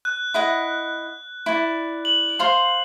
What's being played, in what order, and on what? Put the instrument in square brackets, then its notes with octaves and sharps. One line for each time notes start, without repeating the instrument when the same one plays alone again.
[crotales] F#6
[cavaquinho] E4 D#5 F#5
E4 D5
[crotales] F#7
[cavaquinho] C5 F5 C6